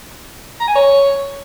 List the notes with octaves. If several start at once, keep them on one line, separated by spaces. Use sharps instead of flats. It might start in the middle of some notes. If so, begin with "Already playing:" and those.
A#5
G#5
C#5